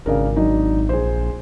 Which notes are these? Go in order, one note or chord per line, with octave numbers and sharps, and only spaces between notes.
G#1 C#3 D4 A#4
F#3 D4 D#4
A#1 G#4 C5